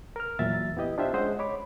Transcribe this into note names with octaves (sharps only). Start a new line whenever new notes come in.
A#4 F6
E2 A#2 F#3 E5 A6
B3 E4 G4 D#5
D4 F4 G4 C5 E5
G#3 C#4 G#4 C5 D#5 F#5
C#5 B5 D6